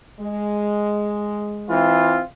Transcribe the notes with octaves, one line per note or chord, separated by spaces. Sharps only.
G#3
E3 C4 F4